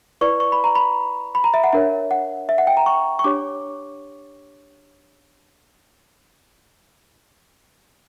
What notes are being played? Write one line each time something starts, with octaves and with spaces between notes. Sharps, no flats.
E4 B4 D5 C#6
C#6
B5
A#5
B5
B5
A#5
E5
F#5
D4 A#4 C#5 E5
F#5
E5
F#5
G5
A#5
C#6
C#6
D4 G4 C#5 D6